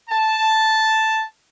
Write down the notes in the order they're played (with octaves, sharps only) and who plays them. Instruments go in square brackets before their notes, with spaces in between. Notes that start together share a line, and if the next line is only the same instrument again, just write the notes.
[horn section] A5